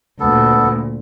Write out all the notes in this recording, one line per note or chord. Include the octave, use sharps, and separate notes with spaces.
D2 A#2 B3 A4